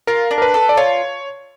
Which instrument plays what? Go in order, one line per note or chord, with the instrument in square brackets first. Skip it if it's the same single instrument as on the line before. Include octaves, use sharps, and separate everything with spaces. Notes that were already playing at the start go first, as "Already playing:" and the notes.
[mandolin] F4 [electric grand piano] A#4
[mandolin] D4
[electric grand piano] A#4
B4
[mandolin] A4
[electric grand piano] D5
[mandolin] F4 [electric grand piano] C#5